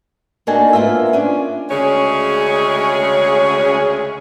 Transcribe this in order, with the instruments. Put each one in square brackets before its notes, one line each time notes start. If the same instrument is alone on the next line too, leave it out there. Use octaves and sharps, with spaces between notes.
[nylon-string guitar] A#3 D4 D#4 F#4 A4 G#5
A#3 B3 F4 C5 E5
C#4 D4
[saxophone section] D2 C#3 G#3 C#4 G#4 C#5